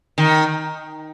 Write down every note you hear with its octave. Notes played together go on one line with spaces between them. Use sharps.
D#3